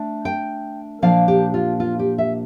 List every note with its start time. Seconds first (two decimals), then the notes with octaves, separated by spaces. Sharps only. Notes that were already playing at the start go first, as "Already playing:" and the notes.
Already playing: A3 D4
0.25 G5
1.02 A#2 F3 A#3 D4 F5
1.28 G4
1.54 F4
1.80 F4
1.99 G4
2.18 E5